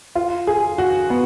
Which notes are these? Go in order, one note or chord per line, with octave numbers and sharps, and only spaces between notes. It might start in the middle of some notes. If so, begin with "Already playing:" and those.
F4
G#4
F#4
B3